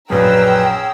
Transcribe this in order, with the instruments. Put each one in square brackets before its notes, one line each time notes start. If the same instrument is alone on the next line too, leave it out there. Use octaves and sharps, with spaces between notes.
[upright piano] A#1 F#2 [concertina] C#4 G#4 [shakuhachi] B4 [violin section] G5 A#5 E6